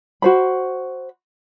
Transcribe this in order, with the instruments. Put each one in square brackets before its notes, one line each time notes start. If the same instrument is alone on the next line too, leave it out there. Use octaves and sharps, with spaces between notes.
[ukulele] F#4 C5 B5